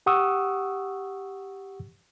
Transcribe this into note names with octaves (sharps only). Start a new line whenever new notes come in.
G4 F#5 C#6 D#6 E6